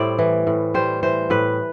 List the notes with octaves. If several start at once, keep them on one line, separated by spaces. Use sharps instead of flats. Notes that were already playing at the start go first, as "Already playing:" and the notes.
Already playing: A2 G3 E4 C5 D5
E3
A2
G3 C5
E3 C5
A2 B4